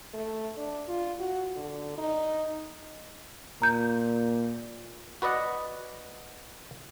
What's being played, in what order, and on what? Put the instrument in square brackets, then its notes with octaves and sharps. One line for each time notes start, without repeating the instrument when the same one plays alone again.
[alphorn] A3
D4
F4
F#4
D3
D#4
[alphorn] A#2 [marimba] A#5 G6
[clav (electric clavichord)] F#4 B4 D5 D#5 F#5